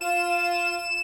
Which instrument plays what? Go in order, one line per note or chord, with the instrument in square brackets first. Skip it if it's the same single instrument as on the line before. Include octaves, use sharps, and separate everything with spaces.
[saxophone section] F4 [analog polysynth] E7